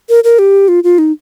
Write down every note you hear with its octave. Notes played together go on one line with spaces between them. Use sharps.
A#4
A#4
G4
F4
F4
D#4